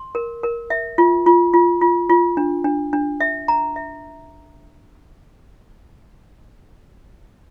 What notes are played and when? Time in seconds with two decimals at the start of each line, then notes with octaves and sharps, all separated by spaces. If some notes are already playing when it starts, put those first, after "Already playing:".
Already playing: C6
0.15 A#4
0.43 A#4
0.70 E5
0.98 F4
1.26 F4
1.54 F4
1.81 F4
2.10 F4
2.37 D4
2.64 D4
2.93 D4
3.20 E5
3.48 A#5
3.76 E5